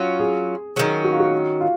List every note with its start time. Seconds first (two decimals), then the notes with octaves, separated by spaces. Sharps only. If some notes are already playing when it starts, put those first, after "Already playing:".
Already playing: F#3 C#4 F4
0.20 G#4
0.76 D#3 F#3 C#4 G#4
1.04 F#4
1.12 F4
1.20 F#4
1.61 F4